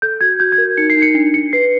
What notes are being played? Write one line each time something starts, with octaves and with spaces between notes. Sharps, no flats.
A4 G6
F#4 G#6
F#4 G6
G#6
A#4
D#4 C#7
C7
D#4
C#7
D4 C#7
D4 C#7
B4 C7